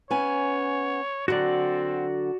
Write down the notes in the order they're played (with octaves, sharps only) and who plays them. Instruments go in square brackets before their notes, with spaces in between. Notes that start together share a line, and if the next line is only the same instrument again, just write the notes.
[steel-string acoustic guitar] B3 C#4 G#5 [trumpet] C#5
[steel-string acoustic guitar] D3 F#3 [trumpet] C4 [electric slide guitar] F#4 D5